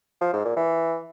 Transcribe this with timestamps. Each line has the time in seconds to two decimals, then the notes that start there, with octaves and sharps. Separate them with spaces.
0.21 F3
0.33 G#2
0.45 A#2
0.57 E3